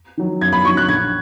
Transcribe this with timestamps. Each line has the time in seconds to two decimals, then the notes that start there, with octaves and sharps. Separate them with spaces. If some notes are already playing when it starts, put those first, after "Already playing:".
0.17 D#3 F#3
0.41 F#2 G#6
0.53 B5
0.65 D#3 F#3 C#6
0.77 F#6
0.89 A#1 G#6